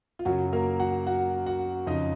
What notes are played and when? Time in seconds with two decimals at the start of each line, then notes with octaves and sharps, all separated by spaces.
0.19 F4
0.25 F#2 F#3 F#4
0.29 C#3
0.53 A#3 A#4
0.80 F#4 F#5
1.07 F#4 F#5
1.46 F#4 F#5
1.87 F2 C#3 D#4 D#5